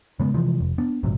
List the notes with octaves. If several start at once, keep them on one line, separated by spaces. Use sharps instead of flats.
C#3 G#3 B3
C3 E3 F3 G#3
F1
B3 D4
A#1 G#2 C3 F#3